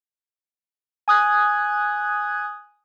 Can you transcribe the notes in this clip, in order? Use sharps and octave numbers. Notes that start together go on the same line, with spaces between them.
G#5 D#6 F#6 G#6